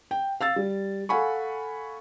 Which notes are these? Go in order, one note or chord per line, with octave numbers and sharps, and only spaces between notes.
G5
F5 E6 A6
G3
A4 F5 F#5 G#5 B5 C#6